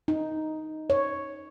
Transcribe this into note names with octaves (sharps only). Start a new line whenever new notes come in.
D#4
C#5